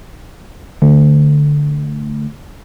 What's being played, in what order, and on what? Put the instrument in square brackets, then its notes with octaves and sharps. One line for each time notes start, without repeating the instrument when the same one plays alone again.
[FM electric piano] D3 A3